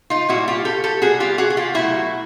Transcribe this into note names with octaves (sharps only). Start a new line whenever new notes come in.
D#4 F4
A#2 G3 E4 F#4
F4 G4
G4 A4
G4 A4
B2 G3 F#4 G#4
F4 G4
F#4 G#4
G#4
F4 G4
B2 F#3 A3 E4 F#4